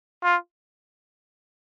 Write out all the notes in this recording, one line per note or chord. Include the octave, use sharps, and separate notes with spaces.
F4